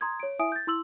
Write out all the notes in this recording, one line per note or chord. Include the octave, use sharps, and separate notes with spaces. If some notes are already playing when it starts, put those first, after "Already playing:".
A#5 C6 D#6 G#6
C#5 D7
E4 E5 G#5 D#6 D7
G6 A6
E4 C6 E6 F#7